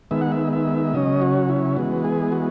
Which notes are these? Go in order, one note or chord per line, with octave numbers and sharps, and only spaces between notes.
D#3 G#3 B3 E5
F#5
E5
E5
C#3 F#3 C#4 D#5
F#4
E4
E3 G#3 B3 F#4
G#4
F#4